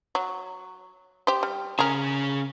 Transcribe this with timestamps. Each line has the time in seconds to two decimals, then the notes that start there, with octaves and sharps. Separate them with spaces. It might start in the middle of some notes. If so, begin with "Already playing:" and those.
0.15 F#3
1.27 G4 C5
1.43 G3
1.79 C#3 C#4 G#4 A#4